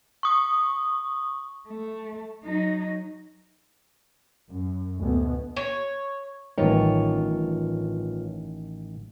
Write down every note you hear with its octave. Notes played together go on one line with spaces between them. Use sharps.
C#6 D#6
A3
F#3 D#4
F#2
D2 B2
C#5
A1 G2 D#3 F4 C#5